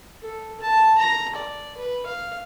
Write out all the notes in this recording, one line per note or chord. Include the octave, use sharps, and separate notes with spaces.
A4
A5
A#5
D5
B4
F5